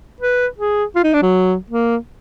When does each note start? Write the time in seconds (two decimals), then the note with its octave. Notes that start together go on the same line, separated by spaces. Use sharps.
0.20 B4
0.58 G#4
0.95 F4
1.04 D#4
1.13 D4
1.22 F#3
1.70 A#3